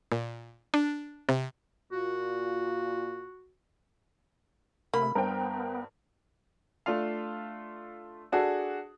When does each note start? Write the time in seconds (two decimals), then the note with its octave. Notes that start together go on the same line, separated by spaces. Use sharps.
0.12 A#2
0.74 D4
1.29 C3
1.92 A#2 F4 F#4
4.94 C3 A3 A#3 B5
5.15 G2 B3 A#4 C5 G5
6.86 A3 D4 F4 F5
8.32 D4 F#4 G#4 A4